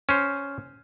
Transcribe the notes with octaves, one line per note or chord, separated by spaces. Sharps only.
C#4 C5